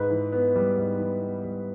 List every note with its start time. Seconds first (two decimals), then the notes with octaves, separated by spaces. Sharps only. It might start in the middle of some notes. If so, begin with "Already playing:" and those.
Already playing: G#2 B4
0.10 E3
0.32 B3
0.56 G3
0.77 G#2
0.99 E3
1.21 B3
1.44 G3